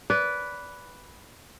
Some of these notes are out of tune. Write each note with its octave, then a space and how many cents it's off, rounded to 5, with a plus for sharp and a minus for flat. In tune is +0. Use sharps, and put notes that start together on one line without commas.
B4 +0 D5 -25